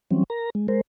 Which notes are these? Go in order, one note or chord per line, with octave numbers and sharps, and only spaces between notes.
E3 F#3 G3 C4 C#4
A#4 A#5
G#3
G#3 A#4 C5